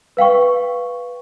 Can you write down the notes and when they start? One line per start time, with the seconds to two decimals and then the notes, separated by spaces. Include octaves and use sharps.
0.17 B4 F5 G5 C#6